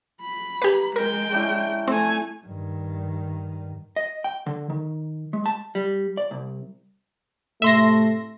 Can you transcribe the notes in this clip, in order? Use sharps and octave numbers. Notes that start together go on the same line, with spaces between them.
B5
A#3 G4 B4
G#3 A#4 G5
C#4 D4 E4
A3 C4 G#5
G2 D#3
D#5
G5
D3
D#3
G#3
A5
G3
D5
C2
A2 C3 A3 E5 C6 A#6